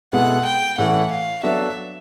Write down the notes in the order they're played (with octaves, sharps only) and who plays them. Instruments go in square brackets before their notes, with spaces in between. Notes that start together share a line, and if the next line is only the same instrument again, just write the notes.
[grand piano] B2 G#3 B3 E4 A4 [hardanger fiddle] F#5
[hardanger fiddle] G5
[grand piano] A2 E3 A3 C#4 [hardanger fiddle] F#5
[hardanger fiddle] F5
[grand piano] F#3 B3 D4 F#4 A4 [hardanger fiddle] E5